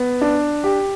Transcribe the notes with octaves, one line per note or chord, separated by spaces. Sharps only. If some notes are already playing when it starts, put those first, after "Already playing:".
Already playing: B3
D4
G4